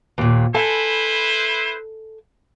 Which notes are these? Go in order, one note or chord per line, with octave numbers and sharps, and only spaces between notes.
D#2 A#2
E4 A4 B4 C5 E5 G#5